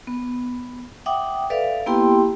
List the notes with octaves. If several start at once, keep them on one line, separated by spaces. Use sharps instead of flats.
B3
E5 F#5 G5 D6 D#6
A4 B4 D5 E5 F5
A#3 B3 E4 G4 G5 C6